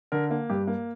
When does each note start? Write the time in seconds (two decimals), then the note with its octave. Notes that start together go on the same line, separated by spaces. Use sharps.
0.12 D3 A#4
0.30 A#3
0.49 G2 G4
0.67 A#3